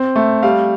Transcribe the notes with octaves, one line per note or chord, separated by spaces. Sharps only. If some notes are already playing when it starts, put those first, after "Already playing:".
Already playing: C4
A3
G3 F5